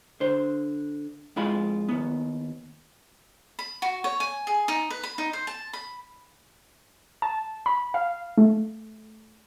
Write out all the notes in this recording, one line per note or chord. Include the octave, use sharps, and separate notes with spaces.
D3 C5
F2 G#3 F4 B5
D#2 B3
B5
F#4
C#5
G#5
G#4
D#4
B4
B5
D#4
C5
A5
B5
A5
B5
F5
A3